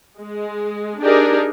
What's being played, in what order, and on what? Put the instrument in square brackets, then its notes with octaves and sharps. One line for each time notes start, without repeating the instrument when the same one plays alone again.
[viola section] G#3
D4 D#4 G4 G#4 A#4